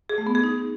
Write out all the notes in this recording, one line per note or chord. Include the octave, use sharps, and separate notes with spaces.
G#4
A3
B3
G#4
D#4